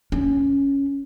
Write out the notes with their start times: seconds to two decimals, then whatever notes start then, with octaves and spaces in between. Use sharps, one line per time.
0.12 C#4